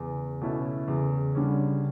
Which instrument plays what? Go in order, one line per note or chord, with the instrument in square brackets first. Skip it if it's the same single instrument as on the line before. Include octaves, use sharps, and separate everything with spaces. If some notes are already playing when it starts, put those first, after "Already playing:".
Already playing: [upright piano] E2 [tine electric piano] C#3
[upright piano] B2 A3 C#4 E4
[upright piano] E2 [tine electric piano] C#3
[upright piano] D3 G3 C#4